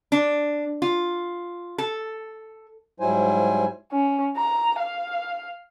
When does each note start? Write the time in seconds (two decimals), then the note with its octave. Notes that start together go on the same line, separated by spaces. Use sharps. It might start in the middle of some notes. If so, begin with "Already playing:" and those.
0.12 D4
0.82 F4
1.78 A4
3.00 G#2 F#3 G3 E4 C5 G#5
3.92 C#4
4.37 A#5
4.79 F5